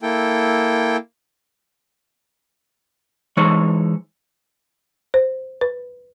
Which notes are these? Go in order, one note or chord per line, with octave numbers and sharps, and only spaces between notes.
A#3 E4 A4 G5
E3 G#3 D#4 C5 C#5
C5
B4